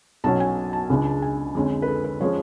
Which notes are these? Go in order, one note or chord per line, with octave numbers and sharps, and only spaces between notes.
B1 B2 F#3 C#4 A5
G#5
A5
C#2 C#3 G#3 D4
G#5
F2 D3 G#3 C#4
B4
A4
B4
F3 G#3 C#4 C#5